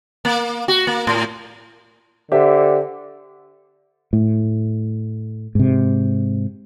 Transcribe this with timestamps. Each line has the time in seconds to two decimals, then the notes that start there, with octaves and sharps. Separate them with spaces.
0.25 A#3
0.68 F#4
0.87 A#3
1.07 A2
2.32 D3 G4 C5 E5
4.13 A2
5.55 G#2 C3